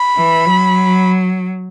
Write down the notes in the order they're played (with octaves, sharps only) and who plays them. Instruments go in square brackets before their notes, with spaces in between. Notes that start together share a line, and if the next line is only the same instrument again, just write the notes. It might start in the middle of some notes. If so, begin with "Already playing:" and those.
Already playing: [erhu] B5
[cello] E3
F#3